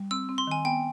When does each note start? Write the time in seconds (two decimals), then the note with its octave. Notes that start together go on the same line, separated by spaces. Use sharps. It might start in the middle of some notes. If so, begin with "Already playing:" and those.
Already playing: G3
0.11 C4 E6
0.29 C4
0.38 C6
0.47 D#3 G#5
0.65 B3 G5